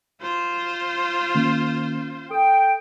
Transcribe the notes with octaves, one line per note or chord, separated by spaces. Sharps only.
F4 C5
D#3 A#3 C#4
A4 G5 D#6